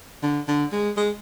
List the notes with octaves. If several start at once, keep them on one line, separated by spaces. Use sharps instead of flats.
D3
D3
G#3
G#3